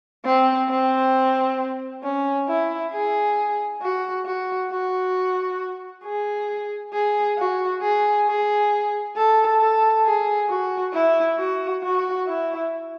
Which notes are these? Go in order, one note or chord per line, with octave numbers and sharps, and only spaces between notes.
C4
C4
C#4
E4
G#4
F#4
F#4
F#4
G#4
G#4
F#4
G#4
G#4
A4
A4
G#4
F#4
E4
F#4
F#4
E4